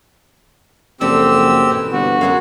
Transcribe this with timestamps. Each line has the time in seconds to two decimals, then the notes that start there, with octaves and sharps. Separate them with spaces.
1.01 F#1 F3 C4 G4 A4 D5 E6
1.71 B2 E3
1.93 G1 F#4
2.21 F#2 G#3 E5 F5